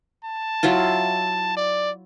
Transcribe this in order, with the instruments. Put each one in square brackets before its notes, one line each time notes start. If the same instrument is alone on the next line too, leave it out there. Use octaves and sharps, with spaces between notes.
[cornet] A5
[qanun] F#3 E4 F4
[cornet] D5